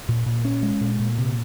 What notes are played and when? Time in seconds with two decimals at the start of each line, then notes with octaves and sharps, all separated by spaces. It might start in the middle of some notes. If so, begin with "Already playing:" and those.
0.09 A#2
0.26 A#2
0.45 C#4
0.63 G#3
0.81 A#2
1.00 A#2
1.18 C3